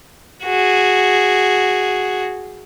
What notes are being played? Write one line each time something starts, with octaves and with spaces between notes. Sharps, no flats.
F#4 G#4